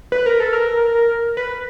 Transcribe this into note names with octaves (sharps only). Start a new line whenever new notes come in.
B4
A#4
A4
A#4
B4